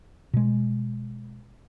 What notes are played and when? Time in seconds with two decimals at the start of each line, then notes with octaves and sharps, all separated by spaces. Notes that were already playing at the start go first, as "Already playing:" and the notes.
0.34 B2 G#3